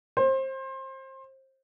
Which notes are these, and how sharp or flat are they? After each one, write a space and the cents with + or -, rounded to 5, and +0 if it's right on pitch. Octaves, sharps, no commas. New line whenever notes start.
C5 +25